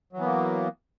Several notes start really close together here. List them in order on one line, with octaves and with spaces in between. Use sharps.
F#3 E3 B3 A#3